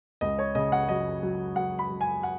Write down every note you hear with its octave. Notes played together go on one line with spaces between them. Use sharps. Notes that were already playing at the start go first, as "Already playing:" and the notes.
C#2 D#5
C#5
C#3 D#5
F#5
F#3 D#5
F#3
F#3 F#5
B5
F#3
G#5
F#5